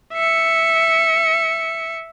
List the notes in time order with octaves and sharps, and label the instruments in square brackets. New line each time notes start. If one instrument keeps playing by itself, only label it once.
[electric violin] E5 C#7